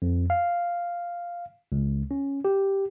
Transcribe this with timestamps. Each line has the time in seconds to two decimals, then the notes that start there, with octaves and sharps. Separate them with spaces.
0.02 F2
0.30 F5
1.72 C#2
2.11 C#4
2.45 G4